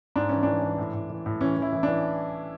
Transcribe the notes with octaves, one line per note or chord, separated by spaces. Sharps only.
G#2 D4
E3 C#4
E3 D4
E3
A2
A2
E3
A2
E3 C#4
E3
E4
E3
D4
E3